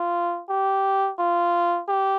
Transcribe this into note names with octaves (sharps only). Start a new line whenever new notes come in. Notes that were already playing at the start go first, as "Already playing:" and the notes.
Already playing: F4
G4
F4
G4